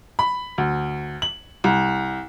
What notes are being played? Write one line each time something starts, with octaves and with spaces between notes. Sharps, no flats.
B5
D2
F#7
C2